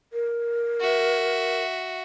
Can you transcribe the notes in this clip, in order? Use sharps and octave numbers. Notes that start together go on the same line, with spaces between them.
A#4
F#4 E5